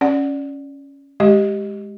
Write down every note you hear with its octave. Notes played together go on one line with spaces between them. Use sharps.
C#4 D5 F#5
G#3 G4 D#5